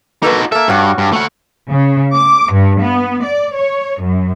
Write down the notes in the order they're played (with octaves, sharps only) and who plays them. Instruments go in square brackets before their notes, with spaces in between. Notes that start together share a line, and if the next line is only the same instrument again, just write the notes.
[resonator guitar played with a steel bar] A#3 A4 B4 [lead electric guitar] D#4 F#4
[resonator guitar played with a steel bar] A#3 A4 [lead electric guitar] E5
[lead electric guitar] G2 [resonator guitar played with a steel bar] C#4 F#4
[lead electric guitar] G2
A3 F#5
[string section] C#3
D6
G2
B3
D5
C#5
F#2